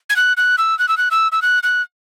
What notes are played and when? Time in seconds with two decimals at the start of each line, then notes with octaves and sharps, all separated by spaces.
0.09 G#6
0.16 F#6
0.37 F#6
0.58 E6
0.79 F#6
0.88 E6
0.97 F#6
1.11 E6
1.32 E6
1.42 F#6
1.63 F#6